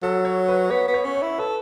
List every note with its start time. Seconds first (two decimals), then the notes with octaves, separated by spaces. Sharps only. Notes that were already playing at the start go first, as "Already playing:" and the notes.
0.02 F#3 A4
0.25 C#5
0.48 B4
0.70 B3 C#5
0.88 B3
0.94 C#5
1.05 C#4
1.16 C#5
1.22 E4
1.38 A4 B4